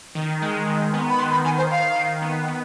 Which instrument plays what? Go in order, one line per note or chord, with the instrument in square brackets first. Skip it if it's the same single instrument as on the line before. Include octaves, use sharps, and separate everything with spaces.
[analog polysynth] D#3
G#3
D#3
B3
[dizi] B5
[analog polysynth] D#3 [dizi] C6
[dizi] B5
[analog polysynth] D#3 [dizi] G#5
[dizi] C5
[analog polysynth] D#3 [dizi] F5
[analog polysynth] D#3
B3
B3